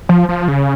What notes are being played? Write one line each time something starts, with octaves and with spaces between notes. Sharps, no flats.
F3
F3
C#3